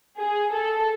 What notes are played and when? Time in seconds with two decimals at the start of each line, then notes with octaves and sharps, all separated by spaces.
0.18 G#4
0.52 A4